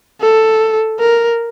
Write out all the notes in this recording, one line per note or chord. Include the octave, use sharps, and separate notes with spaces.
A4
A#4